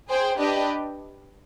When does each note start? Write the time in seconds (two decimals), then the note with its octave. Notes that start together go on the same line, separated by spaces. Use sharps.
0.09 G#4 C5 G5
0.38 D4 G4 B4 D#5